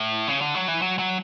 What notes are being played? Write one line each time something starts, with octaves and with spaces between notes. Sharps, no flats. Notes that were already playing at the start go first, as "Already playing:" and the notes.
Already playing: A2
C#3
D3
F#3
E3
F#3
F#3